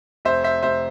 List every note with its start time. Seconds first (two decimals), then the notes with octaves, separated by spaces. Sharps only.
0.25 F1 C5 E5
0.44 C5 E5
0.63 F1 C5 E5